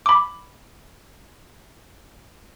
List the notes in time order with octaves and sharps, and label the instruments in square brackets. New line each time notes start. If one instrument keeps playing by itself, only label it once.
[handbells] B5 D6